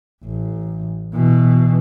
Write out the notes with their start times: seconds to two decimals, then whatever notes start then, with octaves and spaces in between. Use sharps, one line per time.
0.24 A1
1.14 B2 E3